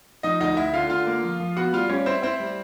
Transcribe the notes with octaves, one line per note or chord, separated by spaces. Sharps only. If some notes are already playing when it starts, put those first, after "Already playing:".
F3 D#4 D#5
D2 D#4 D#5
D2 E4 E5
D3 F4 F5
D3 F4 F5
A#3
F3
F3
B3 F#4 F#5
G3 F4 F5
G3 C#4 C#5
C4 E4 C5
C4 E4 C5
G3